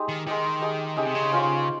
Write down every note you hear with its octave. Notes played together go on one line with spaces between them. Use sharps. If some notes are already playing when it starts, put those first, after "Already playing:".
Already playing: G#3 D#4 G4
D#3
D#3 G#3 D#4 G4
G#3 D#4 G4
C#3 G#3 D#4 G4
C3
C#3
C#4 F4 C5 F5